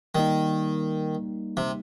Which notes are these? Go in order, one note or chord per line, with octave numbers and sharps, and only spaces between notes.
D#3 G3 A#3 D#4
C3